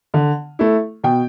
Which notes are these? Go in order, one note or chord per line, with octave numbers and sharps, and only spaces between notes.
D3
A3 E4
B2 G5